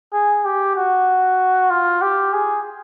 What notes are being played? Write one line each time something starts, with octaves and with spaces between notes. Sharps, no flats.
G#4
G4
F#4
F4
G4
G#4